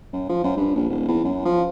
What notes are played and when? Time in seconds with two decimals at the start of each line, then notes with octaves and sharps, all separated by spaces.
0.13 F#2
0.29 F3
0.44 F#2
0.57 G2
0.76 A#1
0.90 D#1
1.08 E2
1.24 F#2
1.46 F3